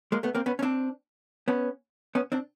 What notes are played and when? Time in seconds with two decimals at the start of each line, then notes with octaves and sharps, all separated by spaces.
0.12 G#3 A#3
0.23 A3 B3
0.35 A#3 C4
0.46 B3 C#4
0.59 C#4
0.62 C4 D4
1.48 B3 C#4
2.15 B3 C#4
2.32 C4 D4